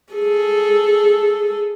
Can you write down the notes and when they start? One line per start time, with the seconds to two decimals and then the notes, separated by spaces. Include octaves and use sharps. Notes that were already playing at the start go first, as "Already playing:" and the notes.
0.14 G#4 A4